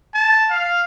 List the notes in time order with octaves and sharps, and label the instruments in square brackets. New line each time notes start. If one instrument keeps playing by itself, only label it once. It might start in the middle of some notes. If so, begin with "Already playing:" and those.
[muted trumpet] A5
F5